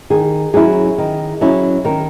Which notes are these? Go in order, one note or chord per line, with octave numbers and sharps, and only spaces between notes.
D#3 G#4
F#3 C#4 E4 G#4
D#3
F#3 C#4 E4
D#3 A#4